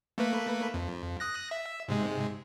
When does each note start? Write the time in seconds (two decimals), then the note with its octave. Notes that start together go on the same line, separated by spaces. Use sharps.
0.18 A3 A#3 B4
0.74 F2
1.20 D#6 F#6 A#6
1.51 E5
1.88 G#2 C3 G#3